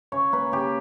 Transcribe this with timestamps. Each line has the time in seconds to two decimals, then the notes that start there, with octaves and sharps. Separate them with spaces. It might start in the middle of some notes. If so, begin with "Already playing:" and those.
0.12 C#3 C#5
0.33 A#3 B4
0.52 C#3 G4